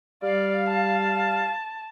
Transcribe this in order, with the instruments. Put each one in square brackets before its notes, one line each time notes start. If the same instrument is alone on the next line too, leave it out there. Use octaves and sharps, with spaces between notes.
[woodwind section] G3 F5 [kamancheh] D5
[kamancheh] A5